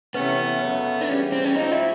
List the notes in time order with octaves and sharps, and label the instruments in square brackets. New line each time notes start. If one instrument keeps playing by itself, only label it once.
[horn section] C3 E3 A3 C#4 [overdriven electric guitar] B3
[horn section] F#2 C#3 F#3 A3
[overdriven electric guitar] D4
[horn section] C#3 E3 G3 [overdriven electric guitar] C#4
[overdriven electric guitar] C4
C#4
[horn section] G#2 F3 A3 C4 [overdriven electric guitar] D#4
[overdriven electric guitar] E4